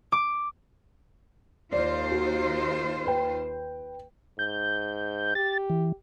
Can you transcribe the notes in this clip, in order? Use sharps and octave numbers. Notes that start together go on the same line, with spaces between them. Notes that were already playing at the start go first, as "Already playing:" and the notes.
D6
D#2 F4 C5 D5
F#4
B4 G5
G#2 G6
G4 A6
E3